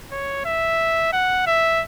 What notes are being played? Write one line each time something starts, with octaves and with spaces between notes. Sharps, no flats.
C#5
E5
F#5
E5